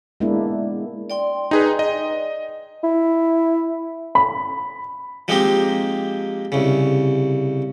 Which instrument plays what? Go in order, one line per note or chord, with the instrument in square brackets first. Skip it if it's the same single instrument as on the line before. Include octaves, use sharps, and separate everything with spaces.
[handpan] G#3 A#3 B3 D4 E4
[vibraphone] D5 G5 C6
[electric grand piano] D#4 G#4 B4
D#5
[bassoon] E4
[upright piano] B5
[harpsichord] F3 G#3 A#3 C4 D#4 G4
C2 C#3